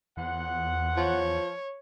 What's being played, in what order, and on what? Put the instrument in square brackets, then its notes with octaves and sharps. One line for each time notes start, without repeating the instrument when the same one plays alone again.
[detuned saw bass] E2 [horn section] A#2 C5 F#5
[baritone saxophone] F3 [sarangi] C#5